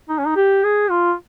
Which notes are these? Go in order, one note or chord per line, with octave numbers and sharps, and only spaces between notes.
D#4
C#4
D#4
G4
G#4
F4